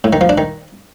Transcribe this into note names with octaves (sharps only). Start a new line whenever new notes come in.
A2
D#3
F3
D4
D#3